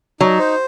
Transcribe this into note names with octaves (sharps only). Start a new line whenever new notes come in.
F#3 D#4
C5